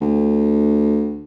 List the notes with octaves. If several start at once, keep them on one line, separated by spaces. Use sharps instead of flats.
D2